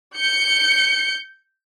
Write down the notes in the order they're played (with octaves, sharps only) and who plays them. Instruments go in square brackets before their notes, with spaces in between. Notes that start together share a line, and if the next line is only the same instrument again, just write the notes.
[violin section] G6 C#7